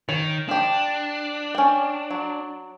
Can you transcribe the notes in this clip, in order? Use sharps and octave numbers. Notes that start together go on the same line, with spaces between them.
D#3 C#5
F3 D4 G4
C#4 G5
F#3